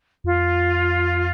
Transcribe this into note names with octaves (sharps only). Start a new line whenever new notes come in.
F2 F4